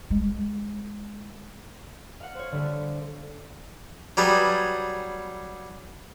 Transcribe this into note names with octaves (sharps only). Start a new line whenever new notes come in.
G#3
F5 F#5
C5 C#5
D3 G3 A3
F#3 G3 G#4 B4